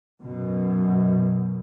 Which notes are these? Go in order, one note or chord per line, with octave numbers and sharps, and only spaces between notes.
F#2 B2